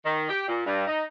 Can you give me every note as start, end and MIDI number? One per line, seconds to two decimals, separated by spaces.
0.05 0.26 51
0.29 0.45 67
0.47 0.63 46
0.66 0.86 43
0.87 1.04 63